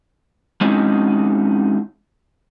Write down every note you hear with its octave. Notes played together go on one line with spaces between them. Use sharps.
G#3 C4 C#4 D#4 E4 F#4